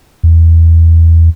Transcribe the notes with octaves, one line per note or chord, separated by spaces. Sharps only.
E2